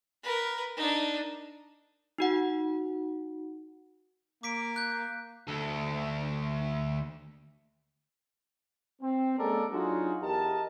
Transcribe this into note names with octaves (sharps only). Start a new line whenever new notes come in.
A#4 B4
D4 D#4
D#4 F#4 F#5
A#3 D6 B6 D7
F#6 G6
D2 A4
C4
G#3 A#3 C#4 A4 A#4 D5
F#3 D4 D#4 F4 F#4 G#4
E2 G4 A#4 D#5 A5